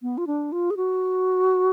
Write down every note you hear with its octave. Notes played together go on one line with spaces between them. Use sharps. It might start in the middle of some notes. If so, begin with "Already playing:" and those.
B3
F4
D4
F4
G#4
F#4